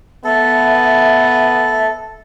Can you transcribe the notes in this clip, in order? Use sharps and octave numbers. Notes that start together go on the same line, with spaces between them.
B3 A4 E5